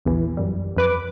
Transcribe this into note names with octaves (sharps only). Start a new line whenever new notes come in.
A#1 E2 E3
F#2 G3
F2 B4 D6